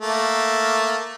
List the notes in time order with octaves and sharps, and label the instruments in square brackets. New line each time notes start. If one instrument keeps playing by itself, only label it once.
[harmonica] A3 A#3